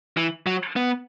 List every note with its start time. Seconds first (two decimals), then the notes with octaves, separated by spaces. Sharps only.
0.17 E3
0.46 F#3
0.76 B3